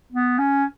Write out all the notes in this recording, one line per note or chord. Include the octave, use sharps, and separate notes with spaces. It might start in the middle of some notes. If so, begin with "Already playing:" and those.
B3
C#4